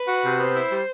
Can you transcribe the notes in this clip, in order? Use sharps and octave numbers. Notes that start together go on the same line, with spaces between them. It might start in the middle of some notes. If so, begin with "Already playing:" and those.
Already playing: B4
F#4
C3
B3 C5
E4
G3